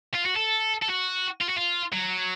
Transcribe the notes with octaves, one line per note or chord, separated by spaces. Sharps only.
F4
F#4
A4
A4
F#4
F4
F#4
F4
F#3